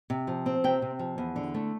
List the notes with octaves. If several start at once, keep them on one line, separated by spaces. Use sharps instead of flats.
C3
F3
C4
C3 G5
C3
F3
E2
D3
A3